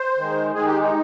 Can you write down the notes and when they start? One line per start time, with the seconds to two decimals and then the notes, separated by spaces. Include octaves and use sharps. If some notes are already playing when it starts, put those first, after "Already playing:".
Already playing: C5
0.17 D#3 G#3
0.54 D#3 G#3 G#4
0.67 G4
0.80 D#4